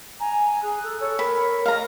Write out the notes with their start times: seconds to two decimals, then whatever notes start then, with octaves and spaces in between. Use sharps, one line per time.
0.20 G#5 A#5
0.62 G#4 F#6
0.83 A4
1.00 A4 C#5
1.19 A#4 B5
1.66 D#5 F5 A#5